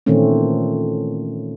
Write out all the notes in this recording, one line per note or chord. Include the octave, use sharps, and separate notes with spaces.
A#2 D#3 E3 A3 C4 C#4